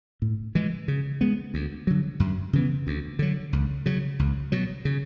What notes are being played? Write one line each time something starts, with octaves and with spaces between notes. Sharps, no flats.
A2
E3 G#3
C#3
G#3 B3
D2
D3 F#3
F#2
C#3 E3 B3
D2
D3 F#3
C#2
C#3 F#3
C#2
B2 F#3
C#3